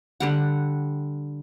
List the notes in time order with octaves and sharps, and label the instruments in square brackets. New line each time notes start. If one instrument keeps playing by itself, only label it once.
[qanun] D3 G3 F#5